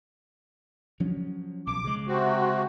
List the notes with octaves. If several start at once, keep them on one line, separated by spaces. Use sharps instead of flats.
F3 F#3 C#4
B1 D6
C#3 G#3
C3 C4 F#4